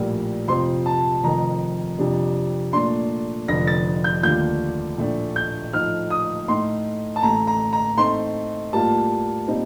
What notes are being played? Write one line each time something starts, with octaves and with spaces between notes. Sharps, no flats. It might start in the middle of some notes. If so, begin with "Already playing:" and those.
Already playing: A#1 A2 G3 A#3
F2 C3 F3 C4 C6
A5
F1 F2 D#3 A#5
F2 C3 G3 D4
A#2 A3 D4 C6
F1 F2 D3 A#6
A6
G6
D#2 D3 A3 D4 F4 G6
A#1 A2 A3 D4
G6
A2 F3 A3 D#4 F6
D#6
A2 A3 D#4 C6
A5
A1 A2 A3 A#5
A#5
A#5
A2 A3 C4 D#4 C6
A2 G3 A#3 F4 A5
A#2 G3 C4 D#4